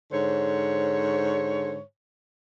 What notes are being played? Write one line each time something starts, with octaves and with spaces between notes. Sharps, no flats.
G#2 D3 C5 C#5